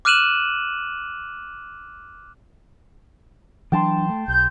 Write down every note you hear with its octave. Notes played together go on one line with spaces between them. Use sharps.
D6 F6 F#6 D#7 E7 F#7
E3 F#3 D4 G5 A5 C6
A3
B1 G6